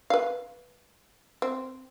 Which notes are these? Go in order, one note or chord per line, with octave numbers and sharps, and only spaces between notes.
B4 F5
C4